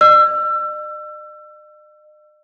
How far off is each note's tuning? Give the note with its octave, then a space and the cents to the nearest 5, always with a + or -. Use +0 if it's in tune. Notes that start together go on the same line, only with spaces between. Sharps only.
D#5 -45 E6 +30